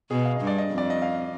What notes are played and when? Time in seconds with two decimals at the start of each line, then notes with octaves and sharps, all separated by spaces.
0.11 B2 G#4
0.25 F5
0.36 G2 D#5
0.47 D5
0.58 D#5
0.71 F2
0.78 D5
0.90 D#5
1.02 F5